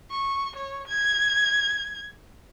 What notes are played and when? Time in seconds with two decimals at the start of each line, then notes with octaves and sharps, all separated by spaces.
0.11 C#6
0.56 C#5
0.88 G#6